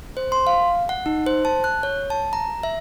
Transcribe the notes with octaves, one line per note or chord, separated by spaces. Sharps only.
C5
C6
F5
F#5
D#4
C5
A5
F#6
C#5
A5
A#5
E5